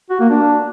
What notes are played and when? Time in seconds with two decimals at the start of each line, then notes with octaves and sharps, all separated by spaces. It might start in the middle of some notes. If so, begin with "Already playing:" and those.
0.10 F#4
0.20 A#3
0.30 D4